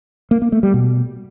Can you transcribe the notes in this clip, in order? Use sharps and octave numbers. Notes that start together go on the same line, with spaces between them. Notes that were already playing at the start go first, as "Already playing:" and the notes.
A#3
A#3
A3
G3
B2